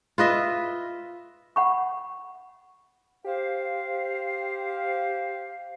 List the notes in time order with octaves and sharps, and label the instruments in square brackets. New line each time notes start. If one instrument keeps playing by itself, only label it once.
[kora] F4 B4 D#5 E5
[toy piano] F#5 B5 C#6
[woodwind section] G4 C5 F5